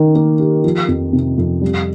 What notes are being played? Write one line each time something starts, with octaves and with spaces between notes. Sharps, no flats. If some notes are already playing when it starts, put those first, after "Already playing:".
Already playing: D#3 D#4
A#3
G4
F3
F2
C3
F2
G3